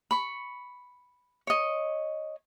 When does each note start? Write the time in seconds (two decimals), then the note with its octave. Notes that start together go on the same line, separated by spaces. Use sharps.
0.11 B5 C#6
1.47 C#5 D#5